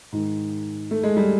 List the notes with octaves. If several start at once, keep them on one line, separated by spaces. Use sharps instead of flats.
G#2 D#3
A3
G#3
G3